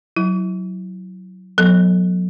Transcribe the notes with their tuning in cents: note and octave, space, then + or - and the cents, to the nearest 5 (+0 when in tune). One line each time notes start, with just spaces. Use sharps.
F#3 +0 E4 -5
F#3 -30 B3 -25 A4 +0